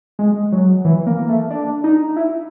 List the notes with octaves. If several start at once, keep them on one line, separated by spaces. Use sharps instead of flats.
G#3
F#3
E3
A#3
A3
D4
D#4
E4